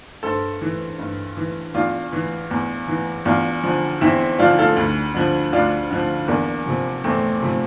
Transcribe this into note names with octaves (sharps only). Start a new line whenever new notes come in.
G2 A4 C5
E3
G2
E3
E2 D4 F4
E3
E2
E3
E2 D4 F4
D3 F3
E2 C4 E4
D3 F3 D4 F4
F4 A4
D2
D3 F3
D2 D4 F4
D3 F3
E2 A#3 D4
C3 F3
E2 A3 C4
C3 F3